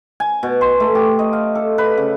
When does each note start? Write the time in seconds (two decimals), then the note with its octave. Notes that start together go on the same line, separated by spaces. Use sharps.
0.20 G#5
0.43 B2
0.61 C6
0.80 A3
0.95 G4
1.19 D#5
1.33 F5
1.55 A4
1.78 B4
1.98 C#3